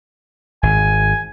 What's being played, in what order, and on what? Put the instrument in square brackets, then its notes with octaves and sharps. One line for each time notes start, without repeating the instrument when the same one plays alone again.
[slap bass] G#1 [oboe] G#5